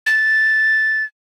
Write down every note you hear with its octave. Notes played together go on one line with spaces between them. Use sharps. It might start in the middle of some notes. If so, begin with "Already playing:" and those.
A6